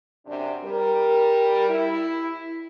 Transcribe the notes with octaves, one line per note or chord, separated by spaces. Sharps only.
F#2 C3 D4
G3 A#4
E4